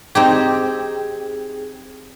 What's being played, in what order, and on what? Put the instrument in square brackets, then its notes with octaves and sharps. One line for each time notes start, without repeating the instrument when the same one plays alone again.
[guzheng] C4 D#4 G4 [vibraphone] G#4